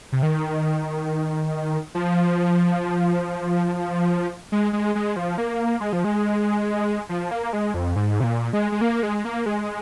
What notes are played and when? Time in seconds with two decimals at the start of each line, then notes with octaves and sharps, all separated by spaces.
0.12 C3
0.23 D#3
1.95 F3
4.52 G#3
4.73 G#3
4.95 G#3
5.16 F3
5.38 A#3
5.80 G#3
5.93 F3
6.04 G#3
7.09 F3
7.31 A#3
7.53 G#3
7.74 F2
7.96 G#2
8.20 C3
8.24 A#2
8.53 G#3
8.72 G#3
8.81 A#3
9.03 G#3
9.25 A#3
9.46 G#3